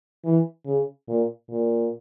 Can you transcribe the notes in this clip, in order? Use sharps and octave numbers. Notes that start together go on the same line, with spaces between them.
E3
C#3
A#2
A#2